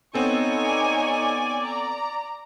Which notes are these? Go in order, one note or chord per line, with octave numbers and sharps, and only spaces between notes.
B3 C4 D#4 A4 C#5 G#5
D5
A#5